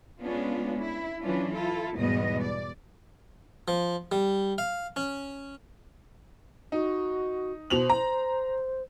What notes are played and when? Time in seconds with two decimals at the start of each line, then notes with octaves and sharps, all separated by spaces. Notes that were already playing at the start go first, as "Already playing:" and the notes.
0.20 G#3 B3 C#4 D4 F4
0.80 E4
1.21 E3 F#3 C#4 D4 F4
1.53 E4 F4 A4
1.95 E2 G#2 B2 G3 B3 D#5
2.41 D5
3.68 F3
4.12 G3
4.58 F5
4.96 C#4
6.72 D#4 F#4
7.70 B2 C5 F7 F#7
7.90 A#5